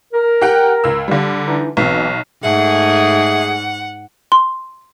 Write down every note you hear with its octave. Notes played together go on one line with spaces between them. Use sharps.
A#4
G4 F#5 G5
C#2 E6
D3 G3
E3 D4 D#4
B1 B2 E3 C4
G#2 A3 G#4 E5 F#5
C6